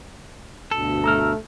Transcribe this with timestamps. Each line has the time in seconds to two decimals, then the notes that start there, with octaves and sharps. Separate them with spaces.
0.71 D2 G2 B2 A4
1.04 A3 A#5 E6 F6